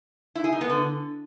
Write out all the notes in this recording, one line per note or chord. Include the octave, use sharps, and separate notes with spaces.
E4
G#4
D#4
B3
D3